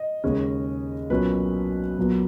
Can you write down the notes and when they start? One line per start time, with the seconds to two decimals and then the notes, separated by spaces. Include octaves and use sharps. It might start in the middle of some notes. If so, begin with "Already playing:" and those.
Already playing: D#5
0.24 D#2 C#3 G#3 C#4
1.10 B1 A#2 F#3 C#4 B4
1.97 B1 A#2 F#3 B3